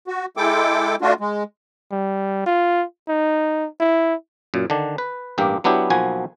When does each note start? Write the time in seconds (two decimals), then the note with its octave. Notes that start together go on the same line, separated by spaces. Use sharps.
0.07 F#4
0.37 G#3 E4 A4 G5 D6
1.01 A3 D4 F4 F#4
1.20 G#3
1.92 G3
2.46 F4
3.09 D#4
3.80 E4
4.54 F#2 A#2
4.70 D3 D#3 D4
4.98 B4
5.38 A1 G2 A#3 G4
5.64 F#3 B3 D4 E4 G4
5.90 B1 F3 A#3 F#4 G#5